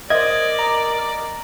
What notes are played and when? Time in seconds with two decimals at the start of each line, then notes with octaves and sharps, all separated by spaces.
0.10 A#4 C5 D5 D#5 G#6
0.59 A#5